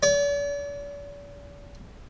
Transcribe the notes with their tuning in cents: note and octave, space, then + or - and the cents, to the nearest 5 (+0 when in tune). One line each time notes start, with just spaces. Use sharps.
D5 -45